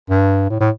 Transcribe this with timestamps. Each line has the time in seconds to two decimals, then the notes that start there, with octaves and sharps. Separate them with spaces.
0.10 G2
0.50 A2
0.60 A2